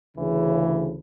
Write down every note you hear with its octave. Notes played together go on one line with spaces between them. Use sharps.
D2 C#3 E3